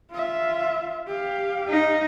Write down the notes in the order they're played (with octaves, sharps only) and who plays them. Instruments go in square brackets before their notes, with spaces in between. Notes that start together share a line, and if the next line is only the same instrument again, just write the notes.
[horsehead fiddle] F4 E5
G4 F5
[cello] D#4